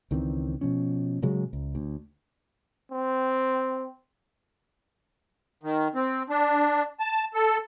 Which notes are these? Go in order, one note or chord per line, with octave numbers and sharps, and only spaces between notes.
C#2 D#3 E3 C4
B2 F3 C#4
A#2 C#3 F#3 G#3
C#2
D2
C4
D#3
C4
D4
A5
A4